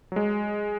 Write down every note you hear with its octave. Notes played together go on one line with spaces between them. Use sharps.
F#3
G#3